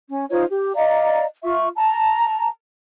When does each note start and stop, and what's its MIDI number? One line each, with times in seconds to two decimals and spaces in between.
0.09 0.25 61
0.31 0.44 63
0.31 0.44 65
0.31 0.44 72
0.31 0.44 73
0.50 0.71 67
0.75 1.25 74
0.75 1.25 75
0.75 1.25 77
0.75 1.25 82
1.44 1.68 65
1.44 1.68 76
1.44 1.68 85
1.76 2.48 81
1.76 2.48 82